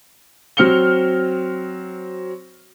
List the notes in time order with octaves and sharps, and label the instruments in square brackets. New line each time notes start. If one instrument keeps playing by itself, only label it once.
[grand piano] F#3 C4 F6 C#7 G7